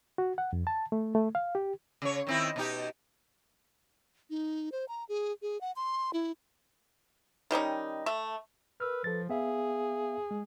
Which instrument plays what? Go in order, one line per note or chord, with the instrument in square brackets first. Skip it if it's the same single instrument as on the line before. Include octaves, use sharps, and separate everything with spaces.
[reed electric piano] F#4
F#5
F2
A5
A3
A3
F5
G4
[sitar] C#3 C#5
D#3 C4 E4
B2 D#4 G4
[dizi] D#4
C5
A#5
G#4
G#4
F#5
C6
E4
[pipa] D#3 G3 C#4 D#4
A3 E5
[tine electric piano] A#4 E6 F6 [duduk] B4
[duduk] F3 [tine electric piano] A4 B4 A6
[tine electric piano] B3 E5 F5 [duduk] G#4
[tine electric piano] G#3